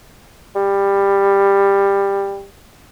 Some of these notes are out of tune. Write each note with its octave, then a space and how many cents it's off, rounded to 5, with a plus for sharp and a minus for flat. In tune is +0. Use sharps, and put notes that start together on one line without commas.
G3 +15